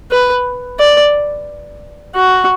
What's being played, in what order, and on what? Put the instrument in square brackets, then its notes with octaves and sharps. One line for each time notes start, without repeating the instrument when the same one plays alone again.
[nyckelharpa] B4
D5
F#4